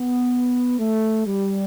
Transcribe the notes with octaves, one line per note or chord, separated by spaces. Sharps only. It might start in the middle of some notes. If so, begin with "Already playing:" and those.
Already playing: B3
A3
G3